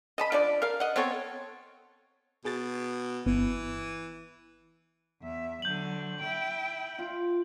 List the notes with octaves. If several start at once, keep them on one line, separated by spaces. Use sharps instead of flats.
D#5 A5 B5
F3 D4 D5
A#4 F5
D#5 F#5
B3 C4 A4 C#5
B2 G#4 A6
G1 E3 B3
E2 E5
D3 F#3 G6 F#7
E4 G5
F4